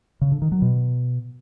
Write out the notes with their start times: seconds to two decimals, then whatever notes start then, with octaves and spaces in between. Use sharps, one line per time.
0.21 C#3
0.32 D3
0.42 D#3
0.52 F#3
0.62 B2